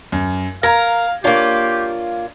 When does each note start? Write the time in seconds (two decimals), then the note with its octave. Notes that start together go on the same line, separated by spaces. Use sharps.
0.12 F#2
0.63 A#4 F5 A#5 G#6 A#6
1.24 A#3 D4 F4 G4 C#5